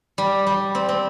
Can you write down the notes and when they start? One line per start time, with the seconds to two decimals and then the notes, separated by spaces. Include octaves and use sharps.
0.18 G3
0.47 G3
0.75 C4
0.89 C4